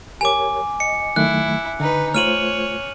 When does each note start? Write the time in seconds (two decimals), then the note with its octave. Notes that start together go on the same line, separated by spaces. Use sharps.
0.21 G4 A#4 C#5 G#5 D6
0.80 D#5 C#7
1.16 D#3 F#3 A3 E4 F#6
1.80 D3 D#4 B4
2.15 A3 F4 C5 C#5 F6 D#7 F#7